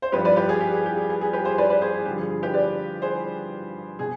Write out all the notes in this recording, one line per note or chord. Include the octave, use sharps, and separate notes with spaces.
C5
G2 F3 G4 B4
B4 D5
G4 B4
G#4
G4
G#4
G4
G#4
G#4
G#4
G4 B4
G#4 C5
B4 D5
B4 D5
G#4 C5
G#4
G2 D3 F3 G4
G#4
G#4
G4 B4
B4 D5
G#4 C5
B2 G#4